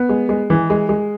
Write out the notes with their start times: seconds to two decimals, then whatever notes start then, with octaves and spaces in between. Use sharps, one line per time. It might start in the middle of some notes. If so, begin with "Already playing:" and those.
Already playing: B3
0.09 G#3
0.29 G#3
0.50 E3
0.70 G#3
0.89 G#3